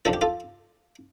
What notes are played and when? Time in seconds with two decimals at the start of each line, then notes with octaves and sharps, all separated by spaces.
0.05 F2 D3 F3 A4
0.13 G4
0.21 F4 A4